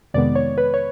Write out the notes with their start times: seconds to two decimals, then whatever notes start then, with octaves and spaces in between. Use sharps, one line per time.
0.14 F2 C3 D#3 G#3 B3 D5
0.35 C#5
0.58 B4
0.74 C#5